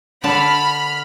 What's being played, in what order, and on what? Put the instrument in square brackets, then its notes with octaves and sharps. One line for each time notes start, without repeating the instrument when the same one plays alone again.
[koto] D3 A5 [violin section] B5 F6